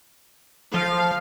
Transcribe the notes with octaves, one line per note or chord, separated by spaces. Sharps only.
F3 F5